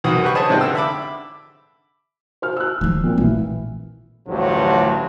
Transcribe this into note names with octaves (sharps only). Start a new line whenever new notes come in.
C2 F#2 D#3 F#4 B4 D#6
D3 G4 B4 B5 C#6
G#4 C5 C#5 D#5 A5
G#2 C3 B3 F4 D5 G5
D3 E6
E5 B5 D6
C5 F6
E6 F#6
D#3 F3
A#2 C4
A#1 A2 E3
A1 D2 G2 F3 F#3